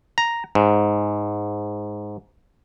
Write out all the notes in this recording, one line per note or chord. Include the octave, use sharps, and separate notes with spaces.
A#5
G#2